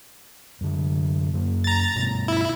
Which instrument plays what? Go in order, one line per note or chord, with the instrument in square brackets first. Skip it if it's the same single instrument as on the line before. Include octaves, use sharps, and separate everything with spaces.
[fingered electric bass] F#2 D3
F#2 A#3
[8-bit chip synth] A#5 A6
[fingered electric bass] G2 B2
[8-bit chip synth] E4